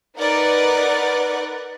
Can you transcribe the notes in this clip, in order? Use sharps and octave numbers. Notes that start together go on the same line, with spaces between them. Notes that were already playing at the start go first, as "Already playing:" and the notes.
D#4 A#4 B4 D5 F#5